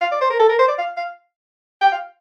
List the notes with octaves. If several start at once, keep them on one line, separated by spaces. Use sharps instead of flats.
F5
D5
C5
A#4
A4
A#4
C5
D5
F5
F5
G5
F5